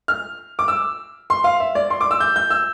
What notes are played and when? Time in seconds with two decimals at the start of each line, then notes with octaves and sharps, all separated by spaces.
0.08 F6
0.59 D6
0.68 E6
1.30 C6
1.44 F5
1.60 E5
1.75 D5
1.90 C6
2.01 D6
2.11 E6
2.20 G6
2.36 G6
2.50 E6